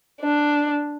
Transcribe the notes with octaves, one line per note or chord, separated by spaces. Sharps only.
D4